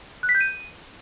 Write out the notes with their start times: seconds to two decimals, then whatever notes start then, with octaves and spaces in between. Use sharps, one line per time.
0.23 F#6
0.29 B6
0.35 G6
0.40 D#7